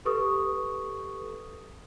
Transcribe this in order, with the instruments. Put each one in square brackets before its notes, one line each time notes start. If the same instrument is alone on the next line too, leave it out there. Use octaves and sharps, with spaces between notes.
[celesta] G4 A4 B4 C#6 D#6